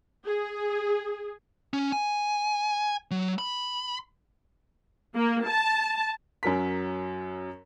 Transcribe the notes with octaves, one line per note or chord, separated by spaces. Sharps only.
G#4
C#4
G#5
F#3
B5
A#3
A5
F#2 F#3 A#4 B6